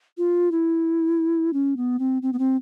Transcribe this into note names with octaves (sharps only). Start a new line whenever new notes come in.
F4
E4
C#4
B3
C4
C4
B3
C4